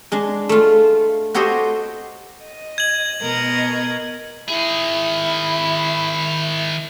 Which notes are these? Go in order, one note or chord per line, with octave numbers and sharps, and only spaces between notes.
G#3 D4
A3 F4
F#4 G4 A4 C5 C#5 D#5
D#5
G#6 F#7
B2 A#4 D#5
D#3 E4 G#4